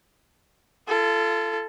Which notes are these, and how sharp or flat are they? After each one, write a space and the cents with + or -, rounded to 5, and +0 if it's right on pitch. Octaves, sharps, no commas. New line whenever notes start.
F4 -35 A4 +0